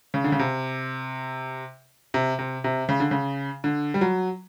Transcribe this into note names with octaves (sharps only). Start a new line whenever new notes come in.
C#3
D3
C#3
C3
C3
C3
C3
C#3
D3
C#3
D3
G3
F#3